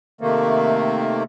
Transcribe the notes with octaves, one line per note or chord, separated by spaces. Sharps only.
C3 D#3 A3 A#3